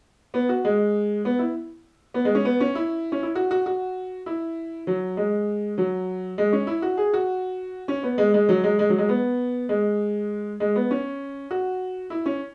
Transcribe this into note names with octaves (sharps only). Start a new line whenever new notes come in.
B3
F#4
G#3
B3
E4
B3
G#3
C#4
B3
C#4
E4
C#4
E4
F#4
F#4
F#4
E4
F#3
G#3
F#3
G#3
C#4
E4
F#4
G#4
F#4
C#4
B3
G#3
G#3
F#3
G#3
G#3
F#3
G#3
B3
G#3
G#3
B3
C#4
F#4
E4
C#4